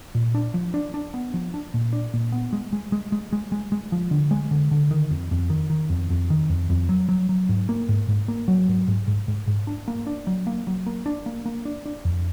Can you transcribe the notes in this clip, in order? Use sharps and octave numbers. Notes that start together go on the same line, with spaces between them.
A#2
D4
F3
D4
D4
B3
F3
D4
A#2
D4
A#2
B3
G#3
G#3
G#3
G#3
G#3
G#3
G#3
F3
D3
G#3
D3
D3
D#3
F2
F2
D#3
D#3
F2
F2
D#3
F2
F2
F#3
F#3
F#3
G#2
A#3
G#2
G#2
A#3
F#3
G#2
G#2
G#2
G#2
G#2
D4
A#3
D4
F#3
A#3
F#3
A#3
D4
A#3
A#3
D4
D4
F2